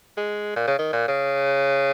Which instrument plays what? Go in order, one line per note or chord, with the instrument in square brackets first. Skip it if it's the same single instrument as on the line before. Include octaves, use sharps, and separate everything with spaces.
[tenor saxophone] G#3
A#2
C#3
D#3
A#2
C#3